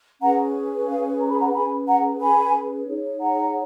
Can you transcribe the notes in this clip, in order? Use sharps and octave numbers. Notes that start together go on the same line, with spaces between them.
C#4 G#4 B4 F#5 A#5
F5 G#5
A#5
B5
F#5 A#5
C#4 G#4 B4 G#5 B5
F#5 A#5
G#5 B5
D#4 G#4 C#5
F#5 A#5